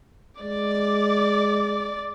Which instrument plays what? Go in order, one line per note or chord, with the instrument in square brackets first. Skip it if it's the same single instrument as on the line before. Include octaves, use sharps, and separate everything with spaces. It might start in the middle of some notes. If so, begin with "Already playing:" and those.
[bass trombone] G#3 [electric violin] D5 D6